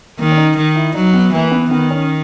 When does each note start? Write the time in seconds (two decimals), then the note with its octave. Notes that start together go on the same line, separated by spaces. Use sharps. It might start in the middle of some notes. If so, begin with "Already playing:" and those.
0.19 D#3 A#3
0.31 C#4
0.37 D#4
0.57 D#3
0.76 E4
0.94 F#3 D#4
1.14 B3
1.33 E3 A#3
1.51 B3
1.71 D#3 B3
1.90 C#4